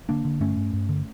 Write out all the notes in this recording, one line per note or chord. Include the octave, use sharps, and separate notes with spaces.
D3 A#3 D4
D3
G2 A3 C#4
G2
G2
D3